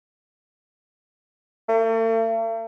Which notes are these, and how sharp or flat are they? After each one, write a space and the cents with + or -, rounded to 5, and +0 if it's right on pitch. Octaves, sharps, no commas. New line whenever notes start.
A3 +45